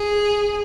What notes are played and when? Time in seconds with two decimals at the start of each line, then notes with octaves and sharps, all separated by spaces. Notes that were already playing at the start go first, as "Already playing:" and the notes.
Already playing: G#4